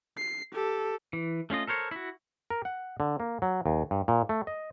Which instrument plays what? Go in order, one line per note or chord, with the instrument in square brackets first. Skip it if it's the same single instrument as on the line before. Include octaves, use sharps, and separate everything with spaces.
[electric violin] C7
G4 A4
[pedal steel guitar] E3
A3 C#4 F4 D#5
A4 A#4 C5 C#5
E4 F#4
[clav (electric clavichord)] A#4
F#5
D3
A#3
F#3
D#2
G2
A#2
A3
D#5